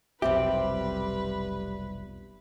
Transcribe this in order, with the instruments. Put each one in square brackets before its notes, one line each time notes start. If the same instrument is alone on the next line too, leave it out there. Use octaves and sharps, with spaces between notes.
[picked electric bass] F1 B1 [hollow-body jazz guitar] G3 C4 G4 [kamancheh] B4 [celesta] E5